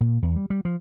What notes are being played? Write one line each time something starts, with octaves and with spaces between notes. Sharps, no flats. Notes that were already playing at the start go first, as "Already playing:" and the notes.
A#2
E2
G3
G3
F3